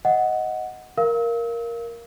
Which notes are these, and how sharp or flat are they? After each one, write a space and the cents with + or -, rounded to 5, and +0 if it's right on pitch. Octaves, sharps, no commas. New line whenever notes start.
D#5 +10 F#5 +0
A#4 +5 F5 -20 E6 -40